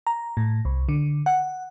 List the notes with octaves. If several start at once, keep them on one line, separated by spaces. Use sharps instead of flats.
A#5
A2
C2
D3
F#5